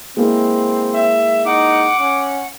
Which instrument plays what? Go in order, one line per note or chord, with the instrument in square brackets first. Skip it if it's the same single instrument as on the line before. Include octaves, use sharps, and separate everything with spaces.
[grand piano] G#3 A#3 E4 [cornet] C4
[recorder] E5
[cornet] D#4 [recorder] F#5 [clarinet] D6
[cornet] C#4 [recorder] F#5